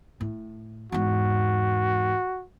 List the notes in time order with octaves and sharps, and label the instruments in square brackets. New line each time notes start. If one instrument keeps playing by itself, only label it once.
[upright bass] A2
[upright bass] E2 G#2 [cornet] F#4